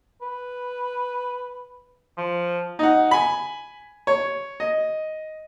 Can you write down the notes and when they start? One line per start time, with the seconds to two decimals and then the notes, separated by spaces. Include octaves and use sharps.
0.22 B4
2.18 F3
2.79 D#4 F#5
3.11 G#5 B5
4.07 C#5
4.60 D#5